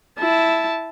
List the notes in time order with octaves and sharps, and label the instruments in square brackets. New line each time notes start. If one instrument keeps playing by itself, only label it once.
[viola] E4 A5